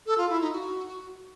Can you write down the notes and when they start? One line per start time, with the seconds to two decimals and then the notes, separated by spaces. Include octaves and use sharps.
0.06 A4
0.18 F4
0.29 E4
0.41 D#4
0.52 F#4